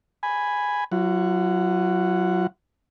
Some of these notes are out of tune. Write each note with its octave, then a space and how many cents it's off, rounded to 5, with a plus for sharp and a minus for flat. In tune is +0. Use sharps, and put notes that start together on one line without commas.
G#5 +0 B5 +0
F#3 +0 F4 -45 F#5 +0